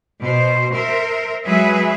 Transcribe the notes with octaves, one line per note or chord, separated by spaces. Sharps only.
B2 C5
A#4 C5 E5
F#3 G#3 G#4 B4 E5